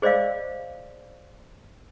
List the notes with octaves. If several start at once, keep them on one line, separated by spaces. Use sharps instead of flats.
G#4 C5 D5 D#5 F5